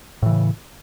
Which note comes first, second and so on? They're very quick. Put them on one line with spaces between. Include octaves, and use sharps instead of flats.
A2 E3 C#3